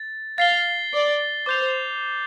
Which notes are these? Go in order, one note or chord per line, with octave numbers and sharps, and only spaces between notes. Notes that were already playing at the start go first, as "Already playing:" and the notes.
Already playing: A6
F5 A6 C7 G7
D5
C5 D6 G6 F7